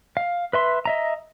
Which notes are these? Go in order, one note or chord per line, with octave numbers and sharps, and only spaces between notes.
F5
B4 E5 C6
D#5 E5 A#5